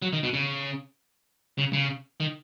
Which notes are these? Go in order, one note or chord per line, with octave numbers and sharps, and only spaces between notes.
F#3
D#3
B2
C#3
C#3
C#3
D#3